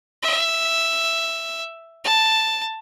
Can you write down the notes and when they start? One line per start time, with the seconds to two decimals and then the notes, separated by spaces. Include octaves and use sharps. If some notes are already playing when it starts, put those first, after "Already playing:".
0.22 E5
2.04 A5